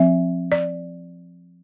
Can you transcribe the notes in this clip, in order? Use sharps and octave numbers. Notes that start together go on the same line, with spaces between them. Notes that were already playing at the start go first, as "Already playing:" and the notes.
Already playing: F3 C4 E5
D5